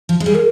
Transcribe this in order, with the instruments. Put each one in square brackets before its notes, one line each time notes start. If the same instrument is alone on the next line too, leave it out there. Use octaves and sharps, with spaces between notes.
[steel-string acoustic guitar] F3
G#3
[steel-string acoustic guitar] G3 [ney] G#4
[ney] A#4